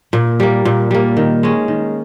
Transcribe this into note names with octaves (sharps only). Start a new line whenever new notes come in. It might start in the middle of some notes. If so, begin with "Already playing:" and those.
A#2
G3 A#3
A#2
G3 A#3
D#3
G#3 C#4
D#3